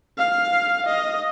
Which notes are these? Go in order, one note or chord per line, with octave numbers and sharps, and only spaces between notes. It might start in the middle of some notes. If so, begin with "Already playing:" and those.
F5
D#5